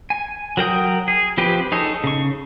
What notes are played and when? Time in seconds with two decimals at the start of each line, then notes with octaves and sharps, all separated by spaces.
0.10 G#5
0.57 F#3 A#4 G5 D#6
1.08 G#4
1.38 F3 C4 G4 B4
1.72 D#4 G#4 A4 C#5
2.04 C#3 C#6